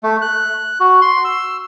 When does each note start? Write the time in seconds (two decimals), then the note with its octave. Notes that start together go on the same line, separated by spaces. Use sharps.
0.03 A3
0.22 F#6
0.80 F#4
1.02 C6
1.24 E6